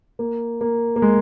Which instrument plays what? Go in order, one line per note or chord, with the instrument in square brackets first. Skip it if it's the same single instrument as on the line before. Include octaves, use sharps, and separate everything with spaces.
[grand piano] A#3
A#3
A#3
G#3